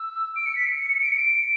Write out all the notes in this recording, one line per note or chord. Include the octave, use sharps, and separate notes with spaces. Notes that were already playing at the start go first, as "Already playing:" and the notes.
Already playing: E6
D7
C#7
B6
C#7
D7
C#7
D7